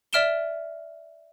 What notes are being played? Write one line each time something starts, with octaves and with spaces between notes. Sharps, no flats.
D5 E5 F6 D7 E7 G7